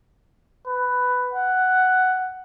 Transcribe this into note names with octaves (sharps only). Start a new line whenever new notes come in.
B4
F#5